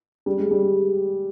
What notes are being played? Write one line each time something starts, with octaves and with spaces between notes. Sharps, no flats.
G3
G#3
G3